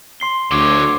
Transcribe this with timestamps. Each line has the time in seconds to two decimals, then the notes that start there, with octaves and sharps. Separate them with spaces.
0.20 C6 C7 G7
0.51 D2 D3 C#5 D6